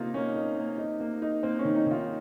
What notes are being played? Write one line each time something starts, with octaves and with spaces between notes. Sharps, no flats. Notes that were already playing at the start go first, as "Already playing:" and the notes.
Already playing: C3 A#3 D#4 F4
A#3 C#4
D#4
A#3
D#4
A#3
D#4
A#3 C4
C#4
D#3
D#4
D#3 F4